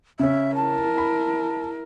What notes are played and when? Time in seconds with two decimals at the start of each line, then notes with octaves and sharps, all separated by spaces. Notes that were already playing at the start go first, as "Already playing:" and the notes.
0.19 C#3 C#4 E5
0.56 E4 A#4 A5
0.98 B5